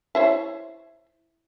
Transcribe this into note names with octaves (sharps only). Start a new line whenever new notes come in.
E4 C5 C#5